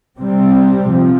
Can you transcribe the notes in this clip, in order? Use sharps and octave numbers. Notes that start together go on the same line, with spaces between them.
C3 G3 C4
C3 F3